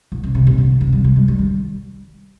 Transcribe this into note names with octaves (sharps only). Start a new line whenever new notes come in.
A#2
C3
C3
A#2
D3
C3
G3
G3
G#3
G3
D#3